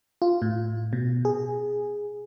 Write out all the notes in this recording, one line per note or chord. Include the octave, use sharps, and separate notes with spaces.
F4
A2
B2
G#4